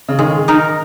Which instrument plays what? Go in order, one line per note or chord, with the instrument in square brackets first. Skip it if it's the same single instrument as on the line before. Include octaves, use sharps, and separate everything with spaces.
[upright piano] C#3
[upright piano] D#3 [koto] G#3
[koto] D#4 A#4